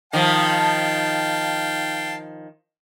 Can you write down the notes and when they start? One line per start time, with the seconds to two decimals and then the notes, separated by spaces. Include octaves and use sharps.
0.13 D#3 F3 F5 G5 A5